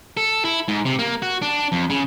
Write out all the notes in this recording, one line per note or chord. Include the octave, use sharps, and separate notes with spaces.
A4
E4
G#2
C3
A#3
F#4
D4
F2
C#3